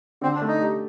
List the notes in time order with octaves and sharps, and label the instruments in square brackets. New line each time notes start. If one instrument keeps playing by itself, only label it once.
[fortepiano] D3 [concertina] C4
[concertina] D4
[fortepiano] A3
[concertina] D#4
[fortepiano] G4